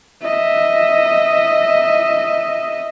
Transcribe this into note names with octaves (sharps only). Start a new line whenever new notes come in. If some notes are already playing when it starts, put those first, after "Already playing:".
D#5 E5